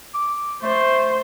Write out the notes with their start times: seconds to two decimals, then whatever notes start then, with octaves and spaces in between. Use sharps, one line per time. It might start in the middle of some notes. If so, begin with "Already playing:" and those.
0.14 D6
0.63 A3 C5